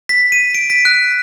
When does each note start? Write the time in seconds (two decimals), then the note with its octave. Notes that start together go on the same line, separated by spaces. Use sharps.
0.09 B6
0.32 D#7
0.55 D7
0.70 B6
0.85 F#6